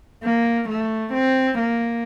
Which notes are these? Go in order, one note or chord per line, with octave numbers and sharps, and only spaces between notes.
A#3
A3
C4
A#3